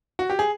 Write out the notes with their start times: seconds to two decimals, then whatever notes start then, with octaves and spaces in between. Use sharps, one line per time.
0.19 F#4
0.30 G4
0.39 G#4